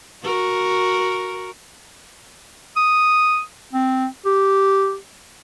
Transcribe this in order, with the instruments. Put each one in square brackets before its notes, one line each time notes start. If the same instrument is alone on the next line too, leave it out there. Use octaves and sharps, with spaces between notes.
[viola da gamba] F#4 A#4
[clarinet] D#6
C4
G4